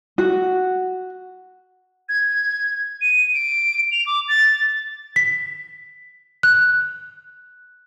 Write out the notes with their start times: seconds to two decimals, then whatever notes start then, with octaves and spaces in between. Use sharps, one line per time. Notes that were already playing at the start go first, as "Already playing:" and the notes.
0.18 F#4
2.09 G#6
3.01 D#7
3.34 D7
3.92 F7
4.06 D6
4.28 A6
5.16 B6
6.43 F#6